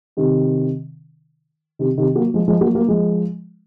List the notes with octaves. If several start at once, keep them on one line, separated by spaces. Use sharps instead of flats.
C3 D#3
C3 D#3
C3 D#3
F#3 A#3
F3 G#3
F3 G#3
F#3 A#3
F#3 A#3
F3 G#3